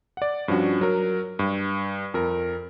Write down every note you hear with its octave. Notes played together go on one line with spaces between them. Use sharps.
D5 F#5
G2 F3 C#4 D4 F#4
F#3 A#4
G2
F2 A#4